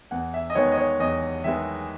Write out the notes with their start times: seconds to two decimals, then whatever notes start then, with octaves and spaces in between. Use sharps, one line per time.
0.11 E2 F#5
0.34 E5
0.50 D#5
0.55 D#3 G#3 B3 C#5
0.72 D#5
0.78 C#5
0.99 E2 D#5
1.44 D#3 G#3 B3 E5